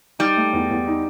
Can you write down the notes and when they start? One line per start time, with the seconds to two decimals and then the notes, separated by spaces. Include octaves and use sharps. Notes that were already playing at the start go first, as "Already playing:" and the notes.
0.19 G3 D#4
0.36 A3
0.53 E2
0.71 E2
0.87 D#4